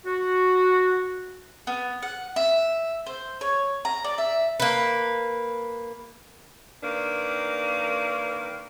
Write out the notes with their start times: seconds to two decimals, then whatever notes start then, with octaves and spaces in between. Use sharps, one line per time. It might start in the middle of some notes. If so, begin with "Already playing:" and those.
0.05 F#4
1.67 B3
2.03 F#5
2.36 E5
3.06 C5
3.41 C#5
3.85 A#5
4.04 D5
4.18 E5
4.60 A#3 B4
6.81 D#3 A#3 D4 B4